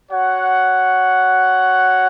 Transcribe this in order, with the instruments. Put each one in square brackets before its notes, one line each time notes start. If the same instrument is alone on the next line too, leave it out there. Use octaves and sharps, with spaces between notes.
[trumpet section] F#4 C#5 F#5